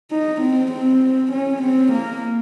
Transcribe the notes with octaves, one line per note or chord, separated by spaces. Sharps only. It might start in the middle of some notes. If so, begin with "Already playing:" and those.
D#4
C4
C4
C#4
C4
A#3